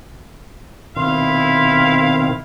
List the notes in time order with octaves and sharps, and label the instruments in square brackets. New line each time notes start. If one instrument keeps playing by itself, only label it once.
[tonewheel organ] B2 D#3 C4 [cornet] E4 [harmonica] F5 [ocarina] C6